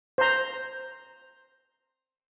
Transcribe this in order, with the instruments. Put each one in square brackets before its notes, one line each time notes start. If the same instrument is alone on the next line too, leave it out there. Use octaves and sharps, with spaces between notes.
[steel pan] C5 A#5